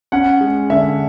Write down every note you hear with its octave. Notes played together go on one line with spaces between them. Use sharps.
C#4 F#5
G#3
D3 E5